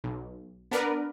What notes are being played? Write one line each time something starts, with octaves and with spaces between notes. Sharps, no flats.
B1
B3 D4 A#4 B4 D5 F#5